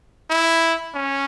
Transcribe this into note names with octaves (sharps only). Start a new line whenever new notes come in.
E4
C#4